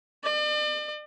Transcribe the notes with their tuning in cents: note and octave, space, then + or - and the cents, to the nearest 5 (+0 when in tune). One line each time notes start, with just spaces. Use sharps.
D5 +40